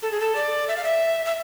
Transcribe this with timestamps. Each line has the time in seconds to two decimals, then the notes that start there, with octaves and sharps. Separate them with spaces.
0.02 A4
0.11 G#4
0.20 A4
0.35 D5
0.68 E5
0.76 F5
0.84 E5
1.25 E5